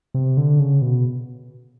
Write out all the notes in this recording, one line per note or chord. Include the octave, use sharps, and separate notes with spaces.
C3
D3
C#3
B2